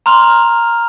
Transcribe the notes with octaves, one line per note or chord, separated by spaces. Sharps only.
A#5 C6 F6 F7